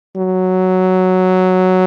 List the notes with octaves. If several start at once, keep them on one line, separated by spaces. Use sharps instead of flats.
F#3